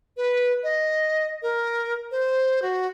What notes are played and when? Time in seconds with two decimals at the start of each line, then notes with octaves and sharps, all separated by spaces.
0.17 B4
0.64 D#5
1.42 A#4
2.11 C5
2.62 F#4